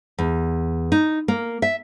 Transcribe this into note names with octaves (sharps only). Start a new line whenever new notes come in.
E2
D#4
A#3
E5